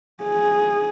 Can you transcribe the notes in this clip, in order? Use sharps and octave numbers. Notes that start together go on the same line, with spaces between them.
G#4